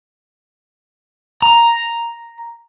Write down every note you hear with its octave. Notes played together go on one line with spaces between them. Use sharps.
A#5